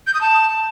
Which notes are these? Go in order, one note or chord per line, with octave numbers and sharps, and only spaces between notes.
G6
D#6
A5